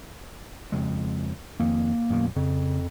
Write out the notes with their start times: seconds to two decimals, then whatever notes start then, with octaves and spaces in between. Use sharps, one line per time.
0.72 F2 C#3 G#3
1.60 F2 D#3 A#3
2.10 F#2 B2 D#3
2.36 F2 C#3